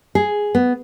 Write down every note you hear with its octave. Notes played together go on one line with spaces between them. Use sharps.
G#4
B3